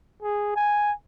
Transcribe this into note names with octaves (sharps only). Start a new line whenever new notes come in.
G#4
G#5